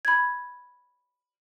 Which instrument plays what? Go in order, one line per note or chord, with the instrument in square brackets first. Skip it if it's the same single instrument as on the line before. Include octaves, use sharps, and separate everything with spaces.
[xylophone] B5 G#6